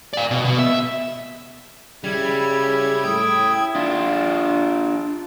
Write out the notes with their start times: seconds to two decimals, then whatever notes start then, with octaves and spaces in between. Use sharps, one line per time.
0.13 D5 F5
0.31 B2
0.45 B2
0.59 E5
2.04 C#3 G3 E4 G#6
3.04 A2 G5 D#6
3.75 D4 F4